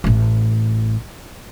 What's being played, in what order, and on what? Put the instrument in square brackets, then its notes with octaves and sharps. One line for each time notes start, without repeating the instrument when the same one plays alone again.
[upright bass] A1 A3